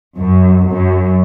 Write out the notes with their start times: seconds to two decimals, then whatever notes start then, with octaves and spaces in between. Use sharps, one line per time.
0.17 F#2
0.67 F#2